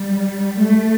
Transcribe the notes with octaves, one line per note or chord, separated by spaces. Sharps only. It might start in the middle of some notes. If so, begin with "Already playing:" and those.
Already playing: G3
A3